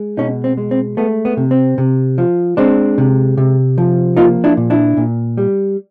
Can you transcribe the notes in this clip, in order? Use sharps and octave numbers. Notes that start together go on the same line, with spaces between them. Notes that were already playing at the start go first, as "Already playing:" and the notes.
Already playing: G#3
B2 C#4 D#4
C4
G#3
C4
A3 B3
B3
C3
C4
C3
F3
G#3 C4 D4
C3
C3
F3
A#3 D#4 F4
D4 E4
A#2
D4 E4
A#2
G3